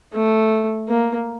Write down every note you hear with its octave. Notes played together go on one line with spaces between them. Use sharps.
A3
A#3